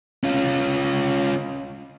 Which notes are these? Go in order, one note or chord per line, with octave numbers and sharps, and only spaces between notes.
C#4 F4